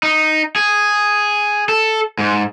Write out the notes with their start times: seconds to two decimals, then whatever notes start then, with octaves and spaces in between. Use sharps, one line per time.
0.03 D#4
0.56 G#4
1.69 A4
2.19 G#2